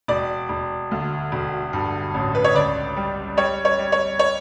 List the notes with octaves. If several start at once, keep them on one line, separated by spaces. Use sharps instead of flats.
E1 D5
E1
D2
E1
G2
A1
B4
C#5
C#2 D5
G3
G3 C#5
C#5
G3
C#5
C#5